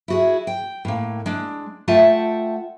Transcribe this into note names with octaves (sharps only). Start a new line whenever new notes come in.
E4 F#4 G#4
G5
A2 A#3
G#3 D4
A3 F4 E5 F#5 G5 A5